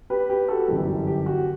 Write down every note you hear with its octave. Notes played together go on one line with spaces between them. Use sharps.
G4 B4
G4 B4
F#4 A4
G1 F#2 E3 G4
G4
F#4